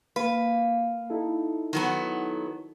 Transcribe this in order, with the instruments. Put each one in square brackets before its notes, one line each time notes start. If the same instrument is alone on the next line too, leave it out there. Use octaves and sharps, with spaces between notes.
[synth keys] A#3 F5 [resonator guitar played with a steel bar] B4
[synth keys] D#4 E4 A4
[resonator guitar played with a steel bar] D#3 F#3 B3